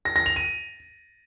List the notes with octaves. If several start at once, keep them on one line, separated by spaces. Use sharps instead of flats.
A#6
A#6
F7
D#7